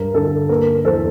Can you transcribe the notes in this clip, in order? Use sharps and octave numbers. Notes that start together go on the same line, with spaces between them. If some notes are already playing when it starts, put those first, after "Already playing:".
Already playing: G2 A#4
D3 A4
A#3 A#4
E2 A4 C5